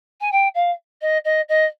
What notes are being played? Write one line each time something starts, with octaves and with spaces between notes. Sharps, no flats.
G#5
G5
F5
D#5
D#5
D#5